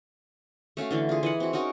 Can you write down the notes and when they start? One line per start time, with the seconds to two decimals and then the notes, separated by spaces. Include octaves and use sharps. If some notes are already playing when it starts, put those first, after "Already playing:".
0.77 A3 C#4 F#4 F5
0.91 D3 E3 A3
1.09 F4 G#4
1.23 E3 D#5 F#5
1.40 C4 F#4
1.53 C#4 D#4 F#4 A#4